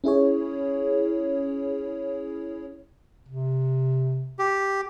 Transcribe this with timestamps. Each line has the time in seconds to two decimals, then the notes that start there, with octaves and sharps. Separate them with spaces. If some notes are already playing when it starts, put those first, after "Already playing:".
0.04 C#4 E4 G#4 C#5
3.28 C3
4.39 G4